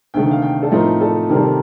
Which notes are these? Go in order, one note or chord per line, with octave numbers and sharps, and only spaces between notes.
D2 C3 D#3 A3 G5
F5
G5
A4
A2 F3 A3 C4 D#4 A#4
A4
C3 D#3 G3 C4 A#4
A4
A#4